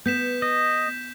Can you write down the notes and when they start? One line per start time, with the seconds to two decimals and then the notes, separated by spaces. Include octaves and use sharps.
0.06 B3 G6 B6 E7
0.42 D#5